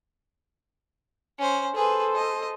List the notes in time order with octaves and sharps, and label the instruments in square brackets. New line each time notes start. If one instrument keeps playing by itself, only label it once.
[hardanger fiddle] C#4 C5
[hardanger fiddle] G#4 B4 [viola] A4 C5
[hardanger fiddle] D#5